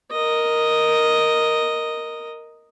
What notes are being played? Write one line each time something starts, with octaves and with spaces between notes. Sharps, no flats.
A#4 D#5